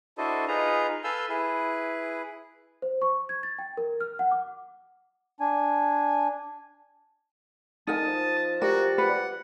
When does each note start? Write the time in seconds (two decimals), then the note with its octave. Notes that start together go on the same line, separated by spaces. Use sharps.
0.18 D4 E4 F#4 A4 C5 D#5
0.48 D#4 F4 G#4 B4 A#5
1.04 A4 B4 F5 G#5 E6 G6
1.29 E4 G#4 B4
2.82 C5
3.02 C#6
3.29 G#6
3.43 A6
3.59 G5
3.77 A#4
4.01 F6
4.19 F#5
4.31 D6
5.40 D4 G#5
7.87 D3 D#4 A#4 G#5 A5 D#6
8.06 F3
8.62 F#4 G4 A#4 D5
8.98 B4 F#5